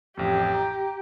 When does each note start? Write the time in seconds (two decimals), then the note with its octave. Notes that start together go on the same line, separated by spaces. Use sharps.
0.17 A1 F2 G4
0.54 A#5